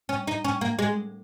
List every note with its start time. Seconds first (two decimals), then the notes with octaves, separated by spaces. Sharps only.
0.09 C#4
0.27 D#4
0.44 C#4
0.61 A#3
0.79 G#3